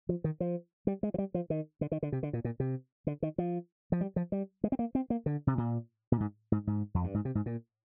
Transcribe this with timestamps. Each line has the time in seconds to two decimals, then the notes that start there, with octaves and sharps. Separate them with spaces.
0.09 F3
0.24 D#3
0.40 F3
0.87 G3
1.03 G#3
1.14 F3
1.18 G3
1.34 F3
1.50 D#3
1.81 D3
1.92 D#3
2.03 D3
2.12 C3
2.23 D3
2.33 A#2
2.44 A#2
2.60 C3
3.07 D3
3.22 D#3
3.38 F3
3.92 F3
4.01 G3
4.16 F3
4.32 G3
4.64 G#3
4.72 C4
4.79 A#3
4.95 C4
5.10 A#3
5.26 D3
5.47 C3
5.58 A#2
6.12 A#2
6.20 G#2
6.52 G#2
6.67 G#2
6.94 F2
7.04 G2
7.14 G#2
7.25 C3
7.35 G#2
7.46 A#2